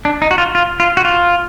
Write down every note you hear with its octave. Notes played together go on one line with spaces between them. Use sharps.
D4
D#4
F#4
F4
F4
F4
F#4
F4